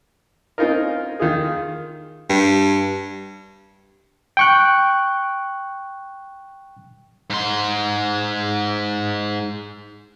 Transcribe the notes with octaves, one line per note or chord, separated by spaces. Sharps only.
C4 C#4 D#4 F4 A#4
D#3 F4 G#4
G2
G5 C#6 F#6
G#2 C6